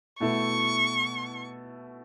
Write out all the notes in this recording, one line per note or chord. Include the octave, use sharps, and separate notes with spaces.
B2 A3 E4 C#6